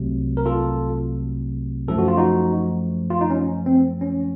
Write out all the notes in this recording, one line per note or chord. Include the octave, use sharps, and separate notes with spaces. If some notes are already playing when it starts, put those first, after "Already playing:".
Already playing: C2 C3 F#3 A3
A#4
F4 A4
F#2 F3 A3 A4
F#4
F4
D#4 F#4
F4
D#4
C#4
C4
C#4